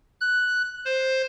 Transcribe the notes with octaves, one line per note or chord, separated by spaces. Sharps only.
F#6
C5